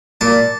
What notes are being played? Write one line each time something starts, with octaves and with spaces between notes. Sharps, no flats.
A#2 A5